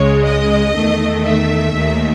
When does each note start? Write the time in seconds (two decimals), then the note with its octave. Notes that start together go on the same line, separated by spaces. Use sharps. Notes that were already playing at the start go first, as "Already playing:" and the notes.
Already playing: C#2 C#3 G#3 C#5
0.26 D#5
0.75 E2 D#3 A3
1.24 E5
1.74 D#2 D#3 A3